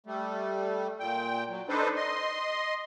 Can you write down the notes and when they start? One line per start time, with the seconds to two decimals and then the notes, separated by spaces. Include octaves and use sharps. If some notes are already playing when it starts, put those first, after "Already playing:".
0.06 G3 A3
1.00 A#2 G5
1.49 F#3
1.69 D4 D#4 A4 B4 C5
1.96 D#5 C6